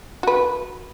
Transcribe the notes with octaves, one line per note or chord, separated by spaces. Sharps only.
F#4 B4